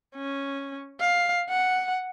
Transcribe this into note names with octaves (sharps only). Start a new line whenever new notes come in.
C#4
F5
F#5